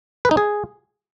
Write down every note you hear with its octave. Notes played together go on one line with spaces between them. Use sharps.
B4
D#4
G#4